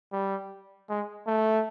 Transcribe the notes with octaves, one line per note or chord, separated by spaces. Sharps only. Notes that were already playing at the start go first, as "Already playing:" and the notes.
G3
G#3
A3